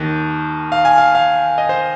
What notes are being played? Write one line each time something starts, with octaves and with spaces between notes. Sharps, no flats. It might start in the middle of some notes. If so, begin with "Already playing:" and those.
Already playing: D#2 D#3
F5
G#5
F5
F5
D#5
C5